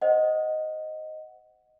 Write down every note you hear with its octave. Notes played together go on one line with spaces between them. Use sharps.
C5 D#5 F#5